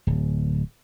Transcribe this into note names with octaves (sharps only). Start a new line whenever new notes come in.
D1